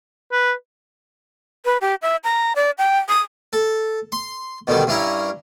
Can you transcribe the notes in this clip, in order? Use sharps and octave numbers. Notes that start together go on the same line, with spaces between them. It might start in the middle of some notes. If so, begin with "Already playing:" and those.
B4
B4
G4
E5
A#5
D5
G5
D#6
A4
C6
B2 D3 D#3 G3
G2 C#4 E4 A#4